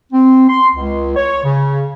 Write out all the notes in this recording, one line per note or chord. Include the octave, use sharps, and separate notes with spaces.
C4
C6
C#2
C#5
C#3